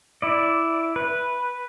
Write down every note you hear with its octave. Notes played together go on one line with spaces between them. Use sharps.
E4 D5
B4